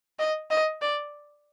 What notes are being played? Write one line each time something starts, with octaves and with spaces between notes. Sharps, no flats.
D#5
D#5
D5